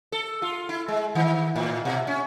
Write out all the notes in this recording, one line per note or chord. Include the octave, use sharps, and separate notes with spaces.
A4
F4
E4
G#3
D#3
A2
B2
C#4